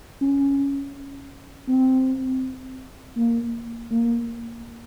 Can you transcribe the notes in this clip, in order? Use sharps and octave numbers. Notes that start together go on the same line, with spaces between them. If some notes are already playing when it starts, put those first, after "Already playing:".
C#4
C4
A#3
A#3